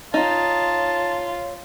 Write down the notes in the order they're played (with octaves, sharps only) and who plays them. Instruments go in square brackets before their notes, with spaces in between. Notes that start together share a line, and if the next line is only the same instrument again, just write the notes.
[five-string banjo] D#4 [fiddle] F4 [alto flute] C#5 [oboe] A5